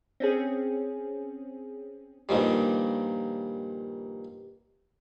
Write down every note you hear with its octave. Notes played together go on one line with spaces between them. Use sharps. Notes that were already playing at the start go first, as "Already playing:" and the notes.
C4 C#4 G#4
G2 A#2 D#3 F3 G3